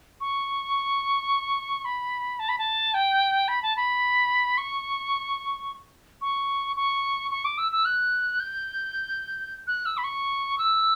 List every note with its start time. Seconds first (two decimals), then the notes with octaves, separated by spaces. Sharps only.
0.21 C#6
1.85 B5
2.39 A5
2.49 B5
2.59 A5
2.94 G5
3.48 B5
3.63 A5
3.76 B5
4.58 C#6
6.22 C#6
6.76 C#6
7.31 C#6
7.45 D6
7.58 E6
7.72 E6
7.85 F#6
8.40 G6
9.67 F#6
9.86 E6
9.98 B5
10.04 C#6
10.58 E6